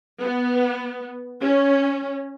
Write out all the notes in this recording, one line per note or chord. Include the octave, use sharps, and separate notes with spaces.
B3
C#4